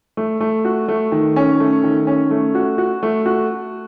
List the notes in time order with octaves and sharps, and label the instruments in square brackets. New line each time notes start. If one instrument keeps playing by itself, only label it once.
[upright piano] A3
A3
F#4
A3
D#3
C#4
A3
D#3
C#4
A3
F#4
F#4
A3
F#4